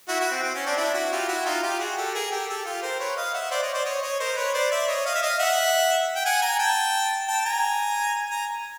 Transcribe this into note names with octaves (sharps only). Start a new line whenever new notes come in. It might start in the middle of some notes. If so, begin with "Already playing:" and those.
E4 F#4
E4 F#4
C4
C4
C#4
C4 D4
D4 E4
E4 F#4
F4 G4
E4 F#4
D#4 F4
F4 G4
F#4 G#4
G4 A4
G#4 A#4
G4 A4
G4 A4
F4 G4
A#4 C5
B4 C#5
D#5 F5
E5 F#5
C5 D5
C#5 D#5
C5 D5
C#5 D#5
C#5 D#5
A#4 C5
B4 C#5
C5 D5
D5 E5
C#5 D#5
D#5 F5
E5
D#5 F5
E5 F#5
G5
F#5 G#5
G#5 A#5
G5 A5
G5 A5
G#5 A#5
G#5 A#5